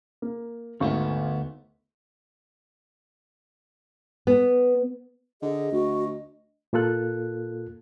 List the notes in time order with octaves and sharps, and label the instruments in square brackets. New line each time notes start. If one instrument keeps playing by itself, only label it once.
[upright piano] A#3
[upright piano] G#1 F5 C#6 [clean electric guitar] D2 A3 B3
[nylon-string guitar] B3
[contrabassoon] D3 [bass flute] G#4 [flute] D#5
[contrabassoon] D2 [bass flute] F#4
[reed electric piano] A#2 A#3 F4 A4 F#6